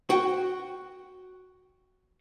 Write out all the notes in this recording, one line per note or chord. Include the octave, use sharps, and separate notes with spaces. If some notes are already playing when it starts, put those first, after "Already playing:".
F#4 F#5 G5